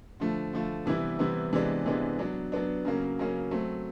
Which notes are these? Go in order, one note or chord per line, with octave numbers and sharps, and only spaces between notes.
D3 F3 A3
D3 F3 A3
C3 E3 G3 B3 E4
C3 E3 G3 B3 E4
C3 E3 G#3 B3 D4
C3 E3 G#3 B3 D4
F#3 B3 D4
F#3 B3 D4
C#3 F#3 A#3 C#4
C#3 F#3 A#3 C#4
F#3 A3 C4